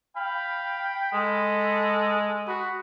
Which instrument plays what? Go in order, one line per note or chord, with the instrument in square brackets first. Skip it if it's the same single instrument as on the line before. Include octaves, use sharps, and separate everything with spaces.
[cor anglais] F5 [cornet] G5 [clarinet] B5
[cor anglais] G#3 [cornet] A4
[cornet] F#4 [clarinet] B5